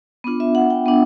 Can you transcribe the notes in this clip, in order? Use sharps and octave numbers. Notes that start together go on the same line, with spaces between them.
B3 D4 F4
E5
F#5
G5
B3 D4